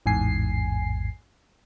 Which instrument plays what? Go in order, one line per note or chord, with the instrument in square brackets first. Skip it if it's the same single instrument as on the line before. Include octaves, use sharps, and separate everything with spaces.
[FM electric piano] A1 E2 G#2 G#5 C7